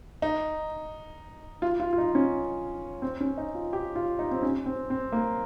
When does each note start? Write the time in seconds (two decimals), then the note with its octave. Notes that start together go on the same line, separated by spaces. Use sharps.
0.22 D#4
1.62 F4
1.80 F4
1.93 F4
1.98 D#4
2.15 C#4
3.02 C4
3.20 C#4
3.38 D#4
3.55 F4
3.73 G4
3.96 F4
4.19 D#4
4.31 C4
4.42 C#4
4.66 C4
4.90 C4
5.12 A#3